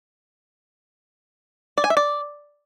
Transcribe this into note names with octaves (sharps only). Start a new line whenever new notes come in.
D5
G#5
E5
D5